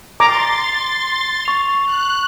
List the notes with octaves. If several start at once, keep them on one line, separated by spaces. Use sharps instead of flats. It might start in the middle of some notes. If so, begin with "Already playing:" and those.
A#5 C6 D6 A6
C#6 F7
F#6